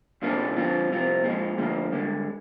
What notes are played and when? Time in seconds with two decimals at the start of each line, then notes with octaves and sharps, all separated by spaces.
0.22 F2 C3 F3 A#3 D4
0.56 D3 F3 C4 F4
0.90 C2 C3 F3 C4 F4
1.24 A#2 F3 G#3
1.57 D2 D3 F3 A#3
1.92 G2 D3 G#3